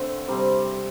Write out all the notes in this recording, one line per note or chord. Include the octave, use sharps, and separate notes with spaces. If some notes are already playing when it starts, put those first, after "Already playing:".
Already playing: D3 A3 C4
C3 G3 C4